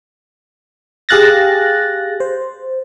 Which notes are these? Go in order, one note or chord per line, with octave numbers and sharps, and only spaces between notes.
G4 G#4 F5 F#6 A6 A#6
C5